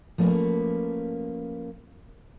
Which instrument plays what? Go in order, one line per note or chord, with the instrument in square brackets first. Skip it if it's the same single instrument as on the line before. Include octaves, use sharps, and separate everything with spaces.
[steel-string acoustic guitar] F3 A3 A#3 C#4 A#4 B4